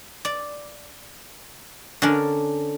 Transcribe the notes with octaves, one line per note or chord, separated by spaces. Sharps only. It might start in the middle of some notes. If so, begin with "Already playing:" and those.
D5
D3 C#4 D4 A#4